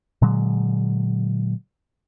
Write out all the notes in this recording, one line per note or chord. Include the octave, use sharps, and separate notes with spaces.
A#2 D3 F#3 G#3